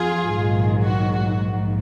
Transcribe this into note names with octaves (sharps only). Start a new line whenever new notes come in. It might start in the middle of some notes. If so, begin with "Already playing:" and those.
Already playing: F2 F4 G#4
A#1 G#2 D#3 F#3
F#4
F#4
A#1 G#2 F3